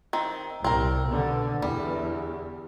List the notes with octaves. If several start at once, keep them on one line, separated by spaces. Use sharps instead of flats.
D#3 C4
C2 C4 A#4
B2 D3
E2 G3